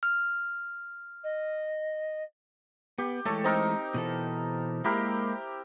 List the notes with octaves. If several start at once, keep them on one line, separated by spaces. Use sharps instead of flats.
F6
D#5
B3 G4
E3 G#3 A3 A4 C#5
C4 D#4 A#4
B2 E3 A4
G#3 A#3 E4 G4 A#4